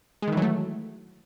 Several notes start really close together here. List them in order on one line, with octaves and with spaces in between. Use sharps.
G#3 D#3 E3 F#3 A3